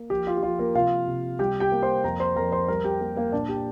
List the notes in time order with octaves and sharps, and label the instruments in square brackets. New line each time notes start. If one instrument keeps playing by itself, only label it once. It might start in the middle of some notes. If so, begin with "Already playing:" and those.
Already playing: [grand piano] A#3
F3 G4
F4
G4
F3 F4
A#3 A#4
C3 F4 F5
C3
G3 G4 G5
G4 G5
A#3
C5 C6
F2 A#4 A#5
C5 C6
F2 A#4 A#5
C5 C6
G3 A#4 A#5
G4 G5
A#3 G4
A#3 A#4
A#2 D4 D5
G4 G5